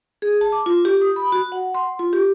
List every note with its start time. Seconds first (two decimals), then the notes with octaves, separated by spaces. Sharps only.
0.22 G#4
0.41 A5
0.52 D6
0.66 F4
0.85 G4
1.02 D#6
1.16 B5
1.32 F#4
1.52 F#5
1.74 C6
1.99 F4
2.13 G4